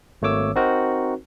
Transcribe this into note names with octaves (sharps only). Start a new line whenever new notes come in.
G#1 A3 A#3 C#5 D6 E6
C4 D#4 F#4 A#4 C5